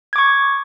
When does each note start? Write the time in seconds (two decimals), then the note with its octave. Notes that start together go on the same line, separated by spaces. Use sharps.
0.13 G#6
0.16 D6
0.18 C#6